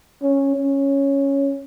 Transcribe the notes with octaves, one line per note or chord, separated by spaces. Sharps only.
C#4
C#4